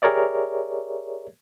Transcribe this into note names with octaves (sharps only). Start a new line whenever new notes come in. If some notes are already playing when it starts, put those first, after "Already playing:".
G4 G#4 A#4 C#5 D5 E5